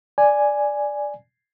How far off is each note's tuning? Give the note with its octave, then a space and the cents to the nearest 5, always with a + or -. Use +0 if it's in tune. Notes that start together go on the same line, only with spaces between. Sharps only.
D5 +0 G#5 +0